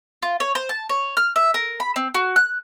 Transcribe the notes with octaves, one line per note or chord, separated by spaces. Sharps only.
F4
C#5
C5
A5
C#5
F6
E5
A#4
B5
C4
F#4
F#6